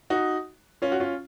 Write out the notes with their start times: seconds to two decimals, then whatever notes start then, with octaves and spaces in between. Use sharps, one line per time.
0.10 D#4 F#4
0.82 C#4 F4
0.92 F#4
1.00 C#4 F4